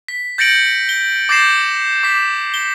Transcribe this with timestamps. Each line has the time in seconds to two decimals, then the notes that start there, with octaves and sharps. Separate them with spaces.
0.08 B6
0.38 G6 A6 A#6 C#7 D7 F#7
0.89 G7
1.29 D6 G6 A6 A#6 C7 E7
2.03 D6 B6
2.54 G7